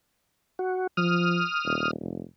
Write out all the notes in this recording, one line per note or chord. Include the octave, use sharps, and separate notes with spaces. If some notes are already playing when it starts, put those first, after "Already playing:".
F#4
F3 D#6 F6
D#1
F1